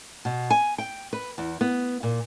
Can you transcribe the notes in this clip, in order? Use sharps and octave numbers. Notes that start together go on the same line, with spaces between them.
B2
G#5
G5
B4
E2
B3
A#2